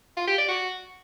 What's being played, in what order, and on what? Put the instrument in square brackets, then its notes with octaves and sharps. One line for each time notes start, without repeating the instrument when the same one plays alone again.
[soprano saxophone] F4
G4
D5
F#4